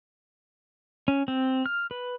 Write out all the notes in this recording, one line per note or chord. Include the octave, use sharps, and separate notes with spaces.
C#4
C4
F6
B4